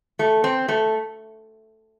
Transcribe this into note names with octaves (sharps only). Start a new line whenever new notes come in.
A3
C4
A3